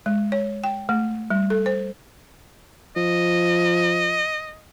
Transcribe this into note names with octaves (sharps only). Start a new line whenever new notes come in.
G#3
C#5
G5
A3
G3
A4
C5
F3 D#5